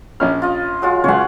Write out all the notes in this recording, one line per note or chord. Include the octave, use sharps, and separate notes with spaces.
A#1 C#4 F6
F4 D#5
F#3 G#3 F4
C#2 C#3 C#5 F#5